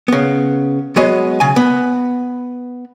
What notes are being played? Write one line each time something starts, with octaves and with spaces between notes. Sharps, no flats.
C#3 B3
F#3 G#3 B3 C#5 D#5
C#3 G#5
B3